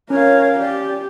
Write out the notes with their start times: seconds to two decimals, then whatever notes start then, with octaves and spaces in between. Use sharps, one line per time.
0.10 C#4 A#4 C#5 F5
0.60 G4 D5